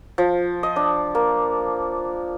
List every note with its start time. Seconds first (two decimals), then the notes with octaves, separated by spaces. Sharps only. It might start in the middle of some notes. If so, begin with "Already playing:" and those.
0.18 F3
0.63 D#5
0.76 D4
1.15 A#3